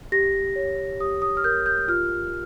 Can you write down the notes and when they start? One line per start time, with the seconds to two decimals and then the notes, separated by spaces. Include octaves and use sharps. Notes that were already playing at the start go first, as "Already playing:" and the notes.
0.12 G4 A#6
0.56 C#5
1.00 G4 D#6
1.22 D#6
1.37 F6
1.44 A#4 G6
1.66 G6
1.88 F4 F6